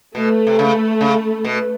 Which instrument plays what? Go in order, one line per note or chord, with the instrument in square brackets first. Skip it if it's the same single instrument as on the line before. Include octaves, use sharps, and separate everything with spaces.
[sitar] B2 [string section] A3
[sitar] C3
C#3
C#3
B2